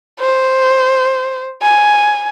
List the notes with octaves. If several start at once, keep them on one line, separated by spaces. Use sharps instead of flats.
C5
G#5